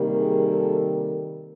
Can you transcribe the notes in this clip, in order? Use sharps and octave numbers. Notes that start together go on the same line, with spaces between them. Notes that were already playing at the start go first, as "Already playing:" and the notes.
Already playing: C3 D#3 G3 A#3
G#4
A4